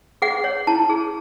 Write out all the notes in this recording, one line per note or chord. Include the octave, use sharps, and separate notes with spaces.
G#4 F#5
C#5
E4 A5
G#4